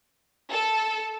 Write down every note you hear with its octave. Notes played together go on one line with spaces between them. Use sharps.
A4